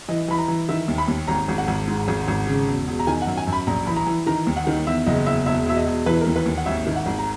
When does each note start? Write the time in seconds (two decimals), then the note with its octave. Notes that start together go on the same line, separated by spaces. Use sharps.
0.09 E3 D#5
0.28 E3 B5
0.38 A#5
0.48 E3
0.69 D#3 E5
0.88 D#2
0.98 B5
1.08 D#2
1.28 G#1 A#5
1.48 G#1
1.58 F#5
1.68 G#1
1.88 G#2
2.08 G#1
2.28 G#1
2.47 C#3
2.68 E1
2.87 E1
3.00 A#5
3.07 D#3 G#5
3.22 F#5
3.27 F#2
3.37 G#5
3.47 F#2
3.53 B5
3.67 A#1 A#5
3.87 E3 B5
3.96 A#5
4.07 E3
4.27 D#3 A#5
4.47 D#2
4.57 F#5
4.67 D#3
4.87 E2 E5
5.07 F#1 D#5
5.26 E2 E5
5.46 E1 E5
5.66 E1 E5
5.76 D#5
5.86 E1
6.06 E3 B4
6.21 A#4
6.27 D#2
6.36 B4
6.46 D#2
6.57 F#5
6.66 G#1 E5
6.87 D#3
6.96 F#5
7.06 G#1
7.18 A#5